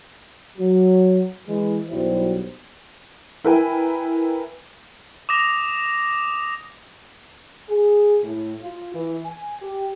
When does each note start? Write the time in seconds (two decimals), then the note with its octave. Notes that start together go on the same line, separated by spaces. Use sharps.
0.58 F#3
1.47 E3 G#3
1.89 B1 F#3 G3 E4 C5
3.45 E4 A#4 B4 G5 G#5
5.29 D6 D#6 A#6 F7
7.69 G#4
8.24 A2
8.61 F4
8.95 E3
9.25 G#5
9.62 G4